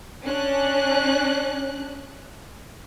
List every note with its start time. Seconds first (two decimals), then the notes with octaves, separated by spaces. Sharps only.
0.25 C#4 D4 F#6